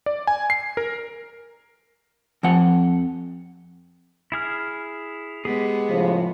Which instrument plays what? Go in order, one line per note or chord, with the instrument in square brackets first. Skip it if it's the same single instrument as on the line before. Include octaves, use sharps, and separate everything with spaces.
[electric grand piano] D5
G#5
C7
A#4
[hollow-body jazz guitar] F2 F3 F#5
[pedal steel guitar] E4 G#4 F6
[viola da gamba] G#3 B3 [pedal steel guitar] G4 G#4
[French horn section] A2 C#3 F3